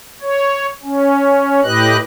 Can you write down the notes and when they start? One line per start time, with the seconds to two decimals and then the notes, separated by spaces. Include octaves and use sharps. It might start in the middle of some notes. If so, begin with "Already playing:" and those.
0.21 C#5
0.83 C#4
1.64 A2 G4 B4 D#5 F#6